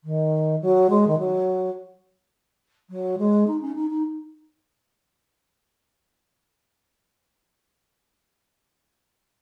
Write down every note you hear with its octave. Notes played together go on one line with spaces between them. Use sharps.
D#3
F#3
G#3
D#3
F#3
F#3
G#3
D#4
C#4
D#4
D#4